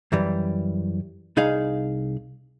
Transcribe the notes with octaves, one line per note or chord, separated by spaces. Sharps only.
F#2 E3 G3
C2 D#4 G#4 F5